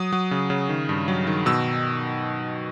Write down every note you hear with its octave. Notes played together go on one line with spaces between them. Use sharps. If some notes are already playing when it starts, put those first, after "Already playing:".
Already playing: F#3 D#6
F#3
C#3
C#3
D#3
G2
F#3
D#3
B2 E6